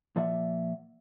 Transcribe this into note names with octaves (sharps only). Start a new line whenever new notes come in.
A#2 F3 D5 E5 F#5